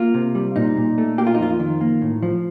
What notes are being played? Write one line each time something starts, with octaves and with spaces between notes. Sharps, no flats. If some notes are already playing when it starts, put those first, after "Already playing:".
Already playing: A#3 F4
C3
G3
A#2 D#4
A#2
A3
A#3 G4
F4
D#4
F2 F4
D#3
A#3
A2
F3